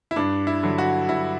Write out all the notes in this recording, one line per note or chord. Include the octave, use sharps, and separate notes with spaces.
E4
G2 D4
E4
D3 F#3
F#4
G2 E4